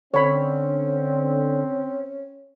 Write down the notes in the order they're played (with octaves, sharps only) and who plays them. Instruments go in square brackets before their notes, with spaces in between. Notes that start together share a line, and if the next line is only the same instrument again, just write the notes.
[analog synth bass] D3 [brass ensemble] C4 [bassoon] C#4 [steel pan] C#5 B5